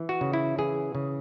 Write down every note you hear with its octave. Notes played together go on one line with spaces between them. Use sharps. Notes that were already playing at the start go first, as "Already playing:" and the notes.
Already playing: E3
F#4
C#3
E4
E3 G#4
C#3